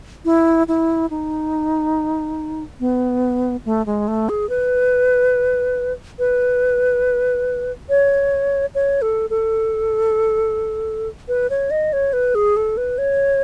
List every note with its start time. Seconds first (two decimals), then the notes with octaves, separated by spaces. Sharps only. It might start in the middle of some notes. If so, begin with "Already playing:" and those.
0.25 E4
0.68 E4
1.10 D#4
2.80 B3
3.65 A3
3.86 G#3
4.08 A3
4.29 G#4
4.49 B4
6.19 B4
7.89 C#5
8.75 C#5
9.02 A4
9.30 A4
11.28 B4
11.50 C#5
11.70 D#5
11.93 C#5
12.13 B4
12.35 G#4
12.56 A4
12.77 B4
12.98 C#5